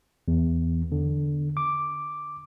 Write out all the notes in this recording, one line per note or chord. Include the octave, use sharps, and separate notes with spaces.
E2
D3
D6